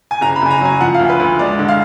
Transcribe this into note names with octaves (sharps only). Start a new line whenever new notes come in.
G#5
F#1 A#5
B5
F#1 G#5
A#5
F#3 G#5
F3 F#5
F5
D2
B4
D2
G#3 D5
D3
F5